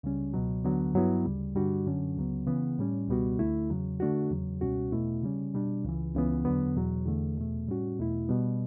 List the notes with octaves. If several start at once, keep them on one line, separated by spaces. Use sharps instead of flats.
C#2 C#3 G3 C#4
C#2 B2 F#3
D2 D3 F#3 B3
G2 F#3 B3 E4
D2 C#3 G3
G2 D3 G3 D4 F#4
F#2 D3 F#3 C#4
C#2 C#3 F#3 B3
C#3 E3 B3
A2 G3 C#4
C#2 B2 G3 B3 F#4
D2 D3 A3 E4
E2 C#3 F#3
D3 A3 D4 F#4
E2 C#3 F#3
C#2 B2 G3 C#4 F#4
E2 B2 A3 E4
C#3 G3 C#4
B2 G3 D4
C#2 C#3 E3
C#2 C#3 E3 B3
E2 D3 F#3 B3
E2 B2 F#3
E2 D3 A3
E2 B2 A3
A2 G3 C#4 F#4
E2 B2 A3 E4
B2 G3 B3